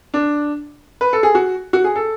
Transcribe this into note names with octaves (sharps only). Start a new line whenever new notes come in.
D4
B4
A4
G#4
F#4
F#4
G#4
A4